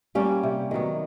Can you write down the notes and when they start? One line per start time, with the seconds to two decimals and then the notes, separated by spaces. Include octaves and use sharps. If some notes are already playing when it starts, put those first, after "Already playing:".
0.15 G3 A#3 C#4
0.43 C3
0.71 D#3 F#3 B3